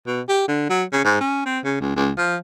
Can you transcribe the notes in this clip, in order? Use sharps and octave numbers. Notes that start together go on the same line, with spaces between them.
B2
G4
D3
F#3
C#3
G#2
C#4
C4
C#3
C#2
C#2
F3